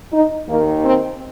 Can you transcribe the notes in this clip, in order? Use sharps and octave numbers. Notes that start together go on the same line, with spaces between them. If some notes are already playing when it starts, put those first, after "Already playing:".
D#4
D#2 D#3 A#3
C4